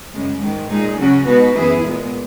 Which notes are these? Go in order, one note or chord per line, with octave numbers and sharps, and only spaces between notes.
F#2 C#3 G#3
G#2 D#3 G#3
A#2 G#3 D#4 G#4
C#3 F#3 C#4 F#4
B2 G#3 B3 D#4 F#4
F#2 E3 B3 E4 G#4
A#2 G#3 B3